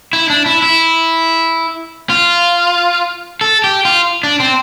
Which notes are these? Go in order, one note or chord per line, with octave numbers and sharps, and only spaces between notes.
E4
D4
E4
E4
F4
A4
G4
F4
D4
C4